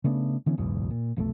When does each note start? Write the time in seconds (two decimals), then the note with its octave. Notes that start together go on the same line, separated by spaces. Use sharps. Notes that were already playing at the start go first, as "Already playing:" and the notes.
0.04 C#3 A3 B3 D4
0.46 D3 E3 B3 C#4
0.58 F#1 B1 E2 G#2
0.91 A#2
1.16 F1 B1 A#2 A3